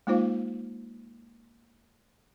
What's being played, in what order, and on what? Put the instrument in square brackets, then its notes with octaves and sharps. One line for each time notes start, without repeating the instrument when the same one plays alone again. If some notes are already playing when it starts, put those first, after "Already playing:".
[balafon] G#3 A#3 D#4 F4 C5 F5